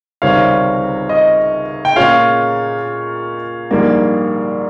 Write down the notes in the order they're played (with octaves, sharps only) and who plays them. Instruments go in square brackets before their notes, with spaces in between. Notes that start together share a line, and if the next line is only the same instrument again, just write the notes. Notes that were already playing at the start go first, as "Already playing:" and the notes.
[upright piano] C#2 C3 D#3 G3 C4 [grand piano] C#5 F5
[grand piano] D#5
G5
[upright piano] A#2 G#3 C#4 F4 G#4 [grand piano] C#5 F5
[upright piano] A#1 G#2 G3 A#3